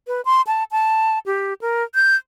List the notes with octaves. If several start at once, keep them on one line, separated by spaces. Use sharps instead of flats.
B4
C6
A5
A5
G4
A#4
G6